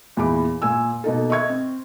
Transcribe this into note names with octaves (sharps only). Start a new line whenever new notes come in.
E2 A#2 E3 B5 D6
A#2 G#5 E6
B2 A#3 D#4 A4
D#5 E5 C#6 G#6
C4